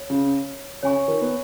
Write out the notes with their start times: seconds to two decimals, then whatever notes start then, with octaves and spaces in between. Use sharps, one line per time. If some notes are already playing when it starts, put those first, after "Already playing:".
Already playing: C#5
0.10 C#3
0.83 C#3 C#5 G#5 C#6
1.08 D#3
1.21 B3